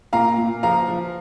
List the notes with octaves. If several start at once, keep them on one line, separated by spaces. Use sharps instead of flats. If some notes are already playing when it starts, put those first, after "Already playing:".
A#2 F5 A#5
A#2
F3 F5 A#5
F3